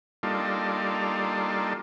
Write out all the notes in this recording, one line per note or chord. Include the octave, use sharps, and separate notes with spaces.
G3 A#3 D4 D#4 F4 A4